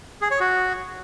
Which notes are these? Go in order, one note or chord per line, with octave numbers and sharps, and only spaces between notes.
G#4
C#5
F#4